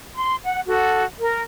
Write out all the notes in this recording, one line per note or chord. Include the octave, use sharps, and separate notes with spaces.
C6
F#5
F#4 A4
A#4